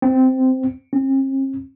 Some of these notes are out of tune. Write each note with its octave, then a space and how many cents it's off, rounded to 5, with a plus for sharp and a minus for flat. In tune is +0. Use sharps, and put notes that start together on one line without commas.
C4 -10
C4 +45